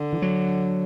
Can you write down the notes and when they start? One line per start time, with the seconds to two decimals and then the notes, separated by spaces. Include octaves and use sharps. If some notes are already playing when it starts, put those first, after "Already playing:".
Already playing: D3
0.13 E3
0.22 F#3